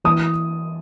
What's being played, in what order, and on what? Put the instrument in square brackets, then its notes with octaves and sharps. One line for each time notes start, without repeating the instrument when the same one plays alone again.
[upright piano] E3 D#6